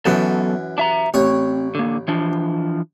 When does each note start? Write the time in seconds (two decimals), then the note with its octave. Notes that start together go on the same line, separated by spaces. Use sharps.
0.06 F#2 E3 F#3 B3 A4
0.78 D4 E5 A#5
1.14 A1 C4 C#5
1.75 D3 A#3
2.08 E3 F3 D4